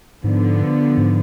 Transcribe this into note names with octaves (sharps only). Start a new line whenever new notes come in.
G#2 D3 F3 B3
G#2